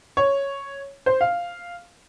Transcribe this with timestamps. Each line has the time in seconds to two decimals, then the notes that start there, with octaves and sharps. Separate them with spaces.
0.17 C#5
1.06 C5
1.21 F5